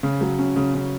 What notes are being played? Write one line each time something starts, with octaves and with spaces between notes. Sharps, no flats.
C#3
F#3
C#4
C#3
C#3